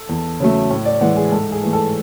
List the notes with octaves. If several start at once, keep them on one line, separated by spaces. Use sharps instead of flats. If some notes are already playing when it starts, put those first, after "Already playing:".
Already playing: A4
E2
C#3 F#3 A3
A2
D5
E3 G#3 F#5
G#4
G#2 A4
G#4
E3 A3
A4